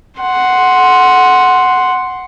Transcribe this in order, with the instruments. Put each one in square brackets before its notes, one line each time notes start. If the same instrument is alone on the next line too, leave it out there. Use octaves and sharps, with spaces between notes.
[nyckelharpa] F#5 C6